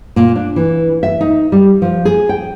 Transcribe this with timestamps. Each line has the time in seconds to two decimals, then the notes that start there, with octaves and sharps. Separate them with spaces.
0.16 A#2
0.36 D4
0.56 E3
1.03 E5
1.21 D#4
1.52 G3
1.82 F3
2.05 G#4
2.29 G5